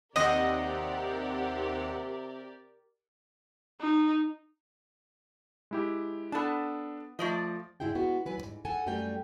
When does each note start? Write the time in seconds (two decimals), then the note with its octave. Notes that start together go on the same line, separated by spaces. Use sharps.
0.16 D#2 C3 C4 G4 A#4 D5 D#5 F#5
3.81 D#4
5.71 G#3 E4 G4
6.32 B3 D4 A4 A5
7.19 F3 A3 D5 D#5
7.80 G#2 D3 E4 G#4 G5
7.95 G#3 B3 F#4
8.26 F#3 B4 G#5
8.38 D#2 G#2
8.65 A4 F#5 G#5 A5
8.86 F#2 G3 A3 A#4 G5 G#5